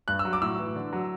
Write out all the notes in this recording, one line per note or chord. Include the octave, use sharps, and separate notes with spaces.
G2 F#6
E6
F#3
D6
A2 E6
E3
D3
F#3